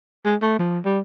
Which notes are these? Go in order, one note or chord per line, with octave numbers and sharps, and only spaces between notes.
G#3
A3
F3
G3